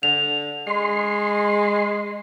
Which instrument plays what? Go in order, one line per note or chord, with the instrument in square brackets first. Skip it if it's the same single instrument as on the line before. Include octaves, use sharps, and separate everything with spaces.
[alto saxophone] D3 [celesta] F7
[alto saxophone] G#3 [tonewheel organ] C6